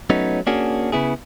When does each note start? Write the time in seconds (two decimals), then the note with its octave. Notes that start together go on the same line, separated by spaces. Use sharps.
0.10 F#3 A3 B3 C#4 D#4
0.47 A#3 C#4 D4 F#4 G#4
0.92 C#3 B3 E4 G#4